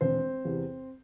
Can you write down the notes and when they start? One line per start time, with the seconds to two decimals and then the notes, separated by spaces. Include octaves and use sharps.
0.01 E1 C4 C5
0.45 E2 C3